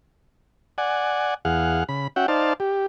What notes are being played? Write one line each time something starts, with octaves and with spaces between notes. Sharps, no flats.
D5 F#5 G#5
E2 G#4 F5 F#5
C#3 B5
C#4 F#4 E5 F#5 G5
D#4 C5 D5 F5 A5
G4